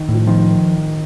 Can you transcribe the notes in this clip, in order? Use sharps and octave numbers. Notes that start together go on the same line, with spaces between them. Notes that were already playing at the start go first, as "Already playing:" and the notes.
Already playing: D#3
A2 F3
D#3 F3